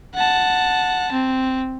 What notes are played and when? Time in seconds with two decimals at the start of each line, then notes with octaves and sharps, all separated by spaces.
0.15 F#5 A5
1.12 C4